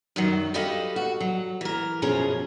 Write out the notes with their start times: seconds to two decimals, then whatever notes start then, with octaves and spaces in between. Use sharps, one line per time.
0.16 F#2 D#3 F#3
0.54 F#4 G4 A4 B4 D#5 F5
0.96 F#4
1.20 F#3
1.61 E3 A#4
2.02 F#2 B2 F3 C#4 G#4 A#4